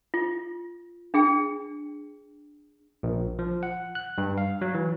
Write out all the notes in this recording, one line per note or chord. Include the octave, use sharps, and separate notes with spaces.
F4
D4 G#4 G5
A#1
F3
F#5
F#6
G2
F5
F#3
E3